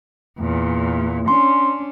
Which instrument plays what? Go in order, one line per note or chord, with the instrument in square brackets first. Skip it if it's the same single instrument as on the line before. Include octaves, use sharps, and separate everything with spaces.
[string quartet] E2 A#2
[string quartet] C#4 D4 [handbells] C6